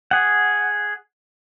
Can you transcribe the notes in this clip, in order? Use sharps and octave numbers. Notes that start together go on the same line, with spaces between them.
G#4 F#5